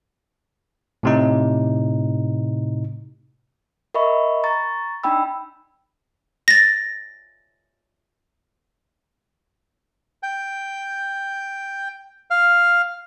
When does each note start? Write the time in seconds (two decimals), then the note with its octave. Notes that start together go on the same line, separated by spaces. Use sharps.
1.03 A2 C3 D#4
3.94 A#4 D#5 E5 B5 C#6
4.44 A#5 C#6 A6
5.04 D4 D#4 G5 B5 E6
6.48 A6 A#6
10.23 G5
12.30 F5